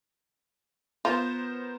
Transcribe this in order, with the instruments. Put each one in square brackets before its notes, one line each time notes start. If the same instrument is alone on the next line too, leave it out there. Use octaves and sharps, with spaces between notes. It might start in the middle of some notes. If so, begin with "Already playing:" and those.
[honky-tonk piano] B3 A#4 C5 [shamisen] F4